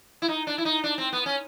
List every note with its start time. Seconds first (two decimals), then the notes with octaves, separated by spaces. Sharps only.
0.22 E4
0.28 D#4
0.47 D4
0.58 E4
0.65 D#4
0.84 D4
0.98 C4
1.13 B3
1.26 C#4